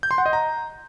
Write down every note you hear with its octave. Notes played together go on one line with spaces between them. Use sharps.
G6
C6
F#5
D#5
A#5